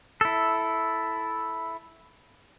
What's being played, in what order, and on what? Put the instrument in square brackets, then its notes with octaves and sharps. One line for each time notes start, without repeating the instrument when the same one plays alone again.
[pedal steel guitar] E4 A4